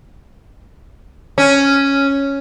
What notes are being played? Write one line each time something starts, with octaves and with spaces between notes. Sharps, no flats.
C#4